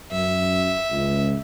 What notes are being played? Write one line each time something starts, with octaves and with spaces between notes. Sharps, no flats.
F#2 E5
C#2